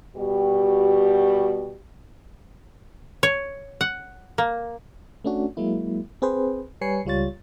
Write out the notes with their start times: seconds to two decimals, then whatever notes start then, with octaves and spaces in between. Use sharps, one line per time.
0.16 B2 G3 F#4 G4
3.23 C#5
3.81 F#5
4.38 A#3
5.24 A3 C#4 D4 F#4
5.57 F#3 G#3 A#3 E4
6.22 C4 G#4 B4 C5
6.81 G3 B4 C#5 G#5 C7 C#7
7.05 C#2 G3 F4 C#5 A6